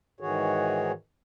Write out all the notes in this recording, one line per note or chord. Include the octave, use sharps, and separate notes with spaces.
G#2 D#3 E3 F#4 G#4 C#5